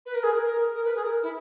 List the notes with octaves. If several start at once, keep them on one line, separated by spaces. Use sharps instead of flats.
B4
A#4
G#4
A#4
A#4
A#4
B4
G#4
A#4
E4